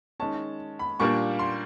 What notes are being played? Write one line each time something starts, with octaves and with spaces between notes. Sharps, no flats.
D#3 G#3 C#4 A5
B5
A#2 G3 A#3 D4 F4 C#6
C6